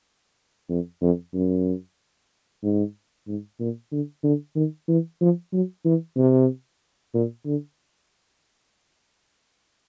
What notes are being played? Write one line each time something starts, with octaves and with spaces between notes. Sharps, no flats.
F2
F2
F#2
G#2
G#2
A#2
D3
D3
D#3
E3
F3
F#3
E3
C3
A#2
D3